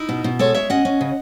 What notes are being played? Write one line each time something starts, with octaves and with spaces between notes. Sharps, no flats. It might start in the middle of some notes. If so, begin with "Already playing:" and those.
Already playing: D#4 E4
B2
B2
G#3 A4 C#5
G#3 C#5 E5
C#4 D#5 F#5
C#4
C#3